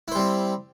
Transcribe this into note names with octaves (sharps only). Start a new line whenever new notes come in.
G3 C4 E4 C5